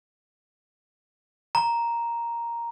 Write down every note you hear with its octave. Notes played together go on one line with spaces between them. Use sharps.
A#5